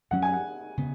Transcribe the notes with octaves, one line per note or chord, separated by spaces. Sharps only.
F#2 F#3 C#4 F#5
G#5
F#5
C#3 B3